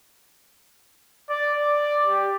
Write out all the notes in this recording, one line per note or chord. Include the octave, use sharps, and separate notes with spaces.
D5
D5
G4